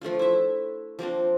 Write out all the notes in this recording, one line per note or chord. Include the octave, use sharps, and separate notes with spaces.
F3 A3 D4 F4
E4 E5
F3 A#3 C4 D4